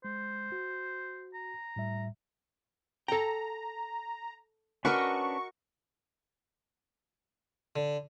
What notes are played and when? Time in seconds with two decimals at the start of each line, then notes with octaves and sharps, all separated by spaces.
0.05 G#3 C5
0.52 F#4
1.34 A#5
1.76 A2 G3 E5
3.08 A4 G5 A#5
4.85 C#4 D4 F#4 A#4 B4 D#5 C#6
7.76 D3